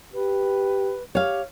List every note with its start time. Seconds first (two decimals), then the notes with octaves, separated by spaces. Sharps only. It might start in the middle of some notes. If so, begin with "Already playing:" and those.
0.14 G4 B4
1.15 G4 C#5 F5